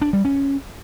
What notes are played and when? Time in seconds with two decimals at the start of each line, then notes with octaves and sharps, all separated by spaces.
0.02 D4
0.13 G3
0.25 C#4